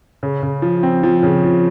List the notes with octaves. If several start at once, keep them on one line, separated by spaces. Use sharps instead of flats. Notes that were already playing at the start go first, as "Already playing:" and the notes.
C#3
C#3
F3
C4
F3
C#3
F3